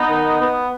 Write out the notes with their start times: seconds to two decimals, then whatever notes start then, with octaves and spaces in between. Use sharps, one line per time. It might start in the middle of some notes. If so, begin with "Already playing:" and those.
Already playing: B3 D#4
0.09 D#3
0.40 B3